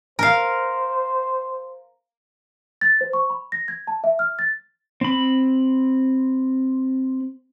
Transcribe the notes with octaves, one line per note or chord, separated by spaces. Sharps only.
A#4 C5 F5
A6
C5
C#6
B5
A#6
G#6
A5
E5
F6
A6
C4 B5